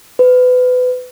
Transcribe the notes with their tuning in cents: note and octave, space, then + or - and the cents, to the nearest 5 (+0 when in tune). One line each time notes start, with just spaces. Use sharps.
B4 +25